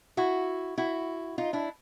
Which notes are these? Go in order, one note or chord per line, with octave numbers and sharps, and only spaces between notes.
E4 F#4
E4 F#4
D#4 F4
D4 E4